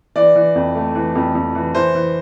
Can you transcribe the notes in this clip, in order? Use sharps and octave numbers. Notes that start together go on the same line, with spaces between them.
E3 D5
E3
F2
A3
E3
F2
F2
E3
E3 C5
E3